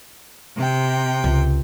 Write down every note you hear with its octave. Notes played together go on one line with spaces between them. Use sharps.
C3 G5
C#2